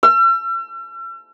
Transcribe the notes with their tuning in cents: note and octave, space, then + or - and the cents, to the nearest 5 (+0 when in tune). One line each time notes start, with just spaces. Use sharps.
E6 +45